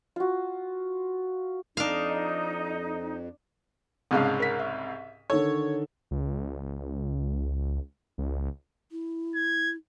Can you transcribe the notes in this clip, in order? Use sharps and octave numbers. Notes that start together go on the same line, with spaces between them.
F4 F#4
F2 D4 D#4 F5
C2 G#2 C#3 F5 A5 D#6
A#4 B6
E5
D3 D#3 A4 C#5
C#2
C#2
E4
G#6